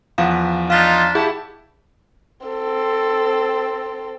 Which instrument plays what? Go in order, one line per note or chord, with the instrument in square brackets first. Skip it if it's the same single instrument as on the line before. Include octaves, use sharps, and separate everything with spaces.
[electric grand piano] E2 F3 F#5 [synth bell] F5
[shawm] D4 [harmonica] D#4 F4 [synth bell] F5 B6
[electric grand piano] E4 G4 [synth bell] G#4 [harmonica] A5
[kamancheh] C4 A4